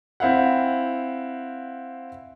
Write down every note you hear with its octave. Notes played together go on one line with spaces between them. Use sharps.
C4 E4 F5 F#5